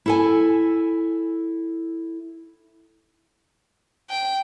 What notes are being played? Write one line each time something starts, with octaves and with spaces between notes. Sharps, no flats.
E4 A4 G#5
G5